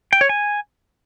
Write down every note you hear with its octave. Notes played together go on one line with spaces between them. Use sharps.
G5
C#5
G#5